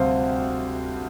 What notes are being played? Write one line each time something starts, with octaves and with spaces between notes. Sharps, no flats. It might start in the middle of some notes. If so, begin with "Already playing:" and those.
Already playing: D2 C3 G3 C5 F5